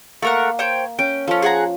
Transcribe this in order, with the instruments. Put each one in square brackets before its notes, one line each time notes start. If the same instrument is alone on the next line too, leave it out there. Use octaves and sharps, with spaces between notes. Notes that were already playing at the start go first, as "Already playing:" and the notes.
[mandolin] A3 A#4 F#5 [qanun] A#3
[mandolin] C5 C#5 G5
[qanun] C#4 [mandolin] G5
[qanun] F3 [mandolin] C#4 A4
[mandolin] G#4 F#5 A#5